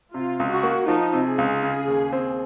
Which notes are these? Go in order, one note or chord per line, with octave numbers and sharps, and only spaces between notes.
C3 F4
C#2
F#4
A#3
F3 D#4
C3
G#4
C#2
C#3
D#2
C4